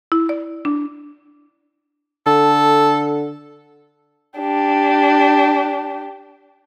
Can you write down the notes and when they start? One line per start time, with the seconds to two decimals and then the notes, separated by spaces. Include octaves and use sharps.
0.12 E4
0.29 D5
0.65 D4
2.27 D3 A4
4.39 D4 G4